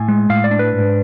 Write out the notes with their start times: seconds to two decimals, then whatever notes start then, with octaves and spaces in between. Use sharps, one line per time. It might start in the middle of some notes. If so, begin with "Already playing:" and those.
Already playing: A2 G#5
0.08 G#3
0.30 A2 F5
0.44 D5
0.51 D4
0.59 B4
0.73 G#2